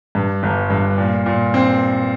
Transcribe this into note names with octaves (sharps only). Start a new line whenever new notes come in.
G2
G1
G2
A#2
A#2
C4